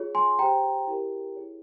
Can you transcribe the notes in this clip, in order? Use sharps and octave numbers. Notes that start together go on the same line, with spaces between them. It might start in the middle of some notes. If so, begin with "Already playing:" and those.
Already playing: F4 G#4 C#5
G#5 C6
G4 C5 G5 A#5
E4 G4 A#4
E4 G#4 C#5